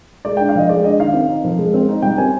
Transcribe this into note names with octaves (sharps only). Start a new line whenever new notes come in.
G#3 D5
D4 G5
F5
F3 D#5
G#3 D5
D4 D#5
D#3 F5
C4
D#4
F3
G#3
C4
D#4
G3 G5
C4 G#5